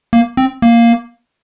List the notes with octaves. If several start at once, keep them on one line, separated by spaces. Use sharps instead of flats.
A#3
C4
A#3